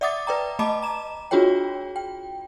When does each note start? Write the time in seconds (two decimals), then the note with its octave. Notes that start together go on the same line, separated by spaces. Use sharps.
0.01 D5 E5 F#5 D6 D#6 A6
0.27 B4 D5 G5 A#5
0.59 A3 D#5 A5 B5 D6
0.82 A#5 E7
1.31 D4 F4 F#4 G#4 C#5 G5
1.96 G5